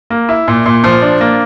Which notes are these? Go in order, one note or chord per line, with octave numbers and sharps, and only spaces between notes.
A#3
E4
A#2
A#2
F3
D4
A#3